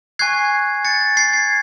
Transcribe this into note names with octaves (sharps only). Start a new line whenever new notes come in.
G#5 C#6 F#6 G#6 C7
A6 C#7
A6
G#6 C7
G#6 C7